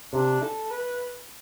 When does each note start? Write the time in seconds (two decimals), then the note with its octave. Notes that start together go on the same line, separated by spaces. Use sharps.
0.13 C3 D4
0.42 A4
0.71 B4